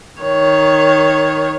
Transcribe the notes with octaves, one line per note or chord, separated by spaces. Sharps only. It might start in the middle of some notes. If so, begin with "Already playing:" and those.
D#3 C#5